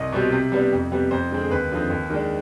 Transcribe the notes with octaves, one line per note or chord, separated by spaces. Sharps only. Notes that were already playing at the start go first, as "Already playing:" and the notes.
Already playing: C2 D#5
B2 G3 C4
C3
G3 B3 D4
F2
C3 G3 B3
F2 C5
D3 G#3 C4
G#4
D#2 B4
D3 F3 C4 D#4
D#2
D#3 G#3 D4